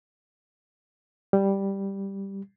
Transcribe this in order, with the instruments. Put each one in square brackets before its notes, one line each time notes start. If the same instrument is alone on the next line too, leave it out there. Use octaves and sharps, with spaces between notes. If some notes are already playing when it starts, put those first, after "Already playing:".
[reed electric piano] G3